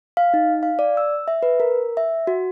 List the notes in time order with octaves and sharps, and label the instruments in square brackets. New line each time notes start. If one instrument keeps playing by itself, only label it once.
[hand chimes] F5
D#4
F5
D5
E6
E5
B4
A#4
E5
F#4